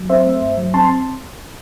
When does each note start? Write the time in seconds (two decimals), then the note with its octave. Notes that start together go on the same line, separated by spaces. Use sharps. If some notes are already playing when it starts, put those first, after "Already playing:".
Already playing: F#3
0.10 C4 C5 E5
0.26 A3
0.42 G2
0.58 F#3
0.74 C4 A5 C6